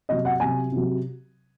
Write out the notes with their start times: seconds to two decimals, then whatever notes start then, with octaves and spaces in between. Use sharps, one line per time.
0.09 C3 F#3 D#5
0.25 F#5
0.40 C3 F#3 G#5
0.72 C3 F#3